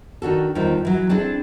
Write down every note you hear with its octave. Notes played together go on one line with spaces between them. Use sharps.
D#3 D4 F#4 A4
E2 D#3 G3 D#4 F4 C5
E3 F#3
C4 D4 E4 G#4 A4